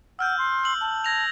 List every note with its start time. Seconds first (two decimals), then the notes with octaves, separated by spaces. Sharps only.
0.19 F#5 E6 F6 G6
0.38 C6
0.63 E6 F#7
0.81 A5
1.04 G#6 A#6 F7